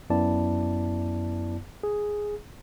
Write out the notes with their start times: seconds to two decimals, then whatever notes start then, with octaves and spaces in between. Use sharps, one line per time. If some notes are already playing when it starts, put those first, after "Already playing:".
0.10 F#2 B3 E4 D5 A5
1.83 G#4